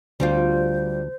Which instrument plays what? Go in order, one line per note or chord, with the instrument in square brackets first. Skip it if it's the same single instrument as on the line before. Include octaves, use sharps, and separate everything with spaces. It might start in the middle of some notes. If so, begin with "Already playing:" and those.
[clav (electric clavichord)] D2 [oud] G3 C4 F4 [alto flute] C5